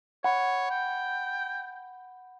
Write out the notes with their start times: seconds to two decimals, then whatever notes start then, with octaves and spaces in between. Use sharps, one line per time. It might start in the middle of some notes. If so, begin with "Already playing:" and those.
0.24 C#5 F#5 B5
0.70 G5